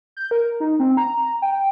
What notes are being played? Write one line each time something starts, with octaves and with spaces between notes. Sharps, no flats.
G6
A#4
D#4
C4
A#5
G5